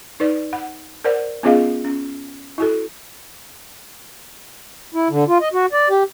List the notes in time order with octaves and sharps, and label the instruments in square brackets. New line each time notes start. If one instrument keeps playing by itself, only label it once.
[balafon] D#4 B4 D5
F#5
A#4 C5 D5 F#5
B3 C#4 F4 G#4 D#5 F5
C#4
E4 F#4 A4
[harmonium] E4
D3
F4
D#5
F#4
D5
G4